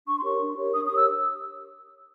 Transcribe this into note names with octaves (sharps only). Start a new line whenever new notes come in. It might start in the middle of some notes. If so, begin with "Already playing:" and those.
D4 C#6
C6
G4 A#4 C#5 C#6
D4
G4 A#4 C#5
D4 D#6
D#6
G4 A#4 C#5 E6